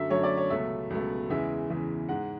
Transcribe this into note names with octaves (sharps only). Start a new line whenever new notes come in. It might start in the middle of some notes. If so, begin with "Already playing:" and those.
Already playing: F#2 D3 F#3 A3 E5
F#2 D3 F#3 A3 C#5
D5
C#5
C#2 B2 F#3 A3 E5
C#2 B2 F#3 A3
E2 C#3 E3 G#3 E5
E2 C#3 E3 G#3
G#2 G#3 F#5